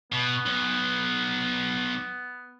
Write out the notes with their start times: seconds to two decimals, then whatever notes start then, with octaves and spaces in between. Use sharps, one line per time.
0.12 B2 B3
0.46 B1